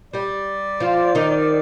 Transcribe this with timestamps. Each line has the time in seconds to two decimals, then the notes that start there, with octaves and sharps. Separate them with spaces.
0.13 G3 G4 D5
0.80 F3 F4
1.15 D#3 D#4